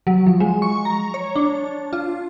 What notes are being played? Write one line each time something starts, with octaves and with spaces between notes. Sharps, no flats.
F#3
F3
G#3
C#6
A#5
C#5
D4
F4